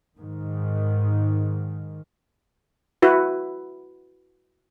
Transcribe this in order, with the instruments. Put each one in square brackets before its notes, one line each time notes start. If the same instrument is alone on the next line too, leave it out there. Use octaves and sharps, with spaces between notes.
[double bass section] G#2 D#3
[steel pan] E4 F#4 B4